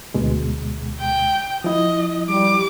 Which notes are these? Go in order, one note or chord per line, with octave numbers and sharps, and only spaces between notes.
D2 B2 G#3
G5
F3 E4 D#5
G3 D6